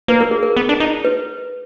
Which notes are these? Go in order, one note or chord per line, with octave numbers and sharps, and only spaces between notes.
A#3 B4
A#4
G#4
A#4
B3
D4
D#4
B4